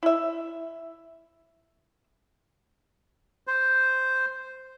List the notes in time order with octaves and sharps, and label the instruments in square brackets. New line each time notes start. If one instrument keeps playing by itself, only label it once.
[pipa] E4 E5
[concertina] C5